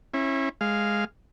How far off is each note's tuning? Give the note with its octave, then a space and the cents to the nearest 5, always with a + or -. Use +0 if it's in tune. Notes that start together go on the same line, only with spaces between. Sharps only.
C#4 -30 E4 +0
G#3 +0 F5 -5